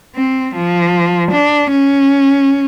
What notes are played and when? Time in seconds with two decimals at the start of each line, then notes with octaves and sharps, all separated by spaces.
0.16 C4
0.55 F3
1.32 D4
1.71 C#4